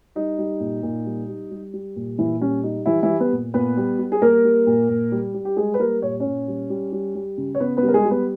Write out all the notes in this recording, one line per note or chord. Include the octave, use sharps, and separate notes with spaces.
G3 D#4
G3
A#2
A#2
G3
G3
G3
G3
A#2
A#2 E3 E4
G3 C#4
G3 D#4
E3 G3 E4
E3 E4
G3
B3 B4
A#2
A#2 B3 B4
G3
G3
G#4
G3 A#3 A#4
G3
A#2
A#2
G3
G3
G4
G3 G#3 G#4
B4
G3 A#3 A#4
A#2 C#5
A#2 C#4 C#5
G3
G3
G3
G3
C#3
C#5
C#3 B3 B4
B3 B4
G3
A#4
G#3 G#4
G3
B3 B4